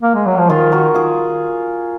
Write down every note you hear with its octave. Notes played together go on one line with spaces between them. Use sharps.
A#3
G#3
F#3
F3
D#3 F4 G#4
F#4 A#4
F4 G#4